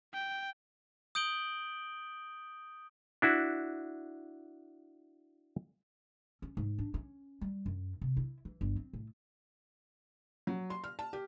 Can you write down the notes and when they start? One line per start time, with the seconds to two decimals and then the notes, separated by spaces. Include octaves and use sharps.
0.13 G5
1.15 D#6 G6 D7 F#7 G7
3.22 D4 E4 F#4
6.42 C#4
6.57 G#2
6.79 D4
6.94 C#4
7.41 G3
7.66 F#2
8.01 C3
8.17 E4
8.45 E3
8.61 G1
8.76 C4
8.93 A2
10.47 F#3
10.70 C6
10.84 F6
10.99 A5
11.13 G4